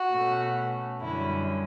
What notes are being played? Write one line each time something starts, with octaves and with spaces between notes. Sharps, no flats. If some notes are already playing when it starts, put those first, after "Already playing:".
Already playing: F#4
B2 A3 C#4
F#2 D3 G3 C#4 E4